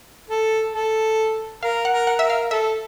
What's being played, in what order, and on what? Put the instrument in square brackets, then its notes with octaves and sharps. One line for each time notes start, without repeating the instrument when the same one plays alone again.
[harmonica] A4
A4
[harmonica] A#4 [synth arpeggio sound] F5
[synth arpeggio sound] F#5
[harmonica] A#4
[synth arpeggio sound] F#5
[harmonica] A#4 [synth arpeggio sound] E5
[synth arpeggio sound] F5
[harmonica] A4 [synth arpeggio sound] E5